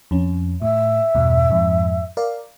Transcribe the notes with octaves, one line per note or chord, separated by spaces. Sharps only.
F2 C#4
A2 E5
E2 G2 B2
F2 G#2
A#4 D5 F5